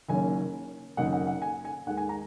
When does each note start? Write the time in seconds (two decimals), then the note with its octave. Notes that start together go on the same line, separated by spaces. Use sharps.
0.09 F#1 F#2 D#3 A#3 C#4 G#5
0.97 G#1 F#2 C#3 A#3 D#4 F#5
1.13 F#5
1.27 F#5
1.42 G#5
1.65 G#5
1.86 D#2 D#3 G#3 F#5
1.97 G#5
2.09 A#5